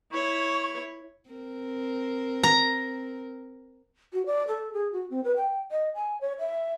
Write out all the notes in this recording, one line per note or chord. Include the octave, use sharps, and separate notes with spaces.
E4 C#5 C#6
C4 A#4
A#5
F#4
D5
A4
G#4
F#4
C4
B4
G5
D#5
G#5
C#5
E5